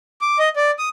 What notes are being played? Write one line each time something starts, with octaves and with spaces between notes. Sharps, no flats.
D6
D#5
D5
D#6